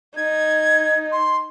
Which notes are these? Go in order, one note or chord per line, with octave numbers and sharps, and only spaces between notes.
D#4 G#6
C6